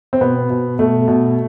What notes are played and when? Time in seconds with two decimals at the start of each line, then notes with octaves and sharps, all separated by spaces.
0.13 C4
0.21 B2 B3
0.50 B2
0.79 B2 A3
1.08 B2